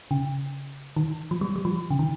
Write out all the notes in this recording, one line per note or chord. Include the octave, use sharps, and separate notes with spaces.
C#3
D#3
F3
G3
G3
F3
C#3
D#3